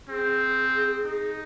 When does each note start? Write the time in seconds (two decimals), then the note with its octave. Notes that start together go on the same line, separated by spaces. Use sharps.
0.09 C4 G#4
1.05 D#4